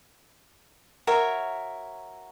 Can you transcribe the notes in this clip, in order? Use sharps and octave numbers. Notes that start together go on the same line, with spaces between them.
F#4 A#4 C#5 E5